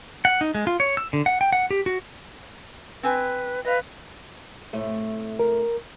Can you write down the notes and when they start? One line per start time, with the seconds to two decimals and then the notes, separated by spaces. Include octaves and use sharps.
0.25 F#5
0.41 D#4
0.55 G#3
0.67 F4
0.80 C#5
0.97 E6
1.13 D3
1.26 F#5
1.41 G5
1.53 F#5
1.71 G4
1.86 F#4
3.03 C4 B4 G#5
3.65 B4 D#5 F5
4.73 A2 C3 A3
5.39 A#4